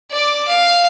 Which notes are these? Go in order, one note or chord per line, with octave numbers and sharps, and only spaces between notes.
D5 D6
F5